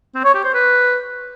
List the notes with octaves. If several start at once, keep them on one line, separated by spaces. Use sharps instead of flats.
C4
C#5
G4
C5
B4